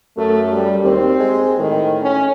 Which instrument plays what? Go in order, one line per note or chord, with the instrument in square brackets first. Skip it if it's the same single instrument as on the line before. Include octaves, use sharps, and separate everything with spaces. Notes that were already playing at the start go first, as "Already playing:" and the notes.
[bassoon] F#2 [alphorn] A3
[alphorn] G3
[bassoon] D#2 [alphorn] C4
[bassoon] G#3
[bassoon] A2 [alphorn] D#3
[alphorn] C#4